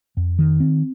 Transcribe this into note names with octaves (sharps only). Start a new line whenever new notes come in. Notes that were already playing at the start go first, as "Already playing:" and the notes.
F2
D#3
C4